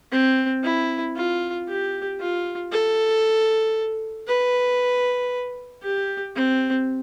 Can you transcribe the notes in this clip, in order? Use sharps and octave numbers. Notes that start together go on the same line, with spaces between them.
C4
E4
F4
G4
F4
A4
B4
G4
C4